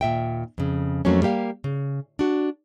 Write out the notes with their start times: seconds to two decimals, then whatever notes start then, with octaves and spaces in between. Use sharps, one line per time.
0.01 D#2 A#2 E5 G5
0.58 F2 C#3
1.05 F2 F#3 A3 A#3 C#4
1.22 G3 A#3 G4 F5
1.64 C#3
2.19 D4 F#4